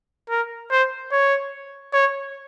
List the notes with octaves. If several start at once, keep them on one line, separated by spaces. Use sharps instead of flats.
A#4
C5
C#5
C#5